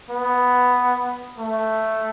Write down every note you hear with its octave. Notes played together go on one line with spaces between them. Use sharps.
B3
A3